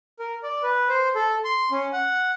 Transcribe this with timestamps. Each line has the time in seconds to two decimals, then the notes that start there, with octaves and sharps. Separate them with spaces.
0.19 A#4
0.43 D5
0.63 B4
0.89 C5
1.15 A4
1.44 C6
1.71 C#4
1.93 F#5